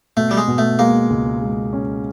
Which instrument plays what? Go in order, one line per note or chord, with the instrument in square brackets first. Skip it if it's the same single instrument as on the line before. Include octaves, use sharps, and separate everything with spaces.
[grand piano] B2 [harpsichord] A3
[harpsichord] G3
G#3
[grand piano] B2
[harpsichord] A3
[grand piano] G#3 [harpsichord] A#3
[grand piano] C#2
G#3
C#4